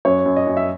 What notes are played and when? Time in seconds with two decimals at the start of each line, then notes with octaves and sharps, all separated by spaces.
0.05 F#2 C#5
0.25 F#2
0.36 D#5
0.47 F#2
0.57 E5